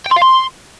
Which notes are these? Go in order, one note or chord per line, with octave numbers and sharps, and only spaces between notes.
G5
C6
F5
C6